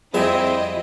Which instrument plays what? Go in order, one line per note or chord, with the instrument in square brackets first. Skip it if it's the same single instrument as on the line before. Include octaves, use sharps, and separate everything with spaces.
[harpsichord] F2 G3 E5 [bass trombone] C4 [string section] E4 D#5 [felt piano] G#4